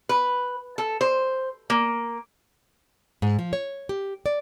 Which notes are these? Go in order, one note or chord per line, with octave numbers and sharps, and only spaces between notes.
B4
A4
C5
A#3
G#2
F3
C#5
G4
D5